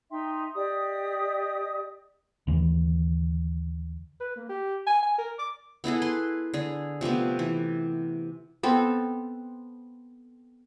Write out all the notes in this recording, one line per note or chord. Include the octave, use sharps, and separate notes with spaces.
D#4 E5 G5 C6
G4 D5 D#5 D#6
D#2 D3 E3
B4
A#3
G4
G#5
G#5
A#4
D6
B3 E4 G#4 A4
B4 C6
D3 G#4
C3 F3 A3 B3
E3
B3 C4 A4